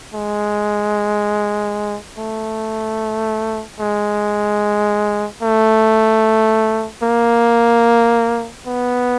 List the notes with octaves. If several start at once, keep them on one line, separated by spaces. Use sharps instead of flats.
G#3
A3
G#3
A3
A#3
B3